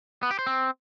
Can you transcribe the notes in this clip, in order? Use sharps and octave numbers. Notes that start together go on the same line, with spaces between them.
B3
G4
C5
C4